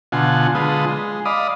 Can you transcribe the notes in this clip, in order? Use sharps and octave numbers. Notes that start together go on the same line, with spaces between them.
B2 D3 F4 F#5 G#5
D3 G#3 F4 B4 D#6
G#3
D5 D#5 F5 B5 D#6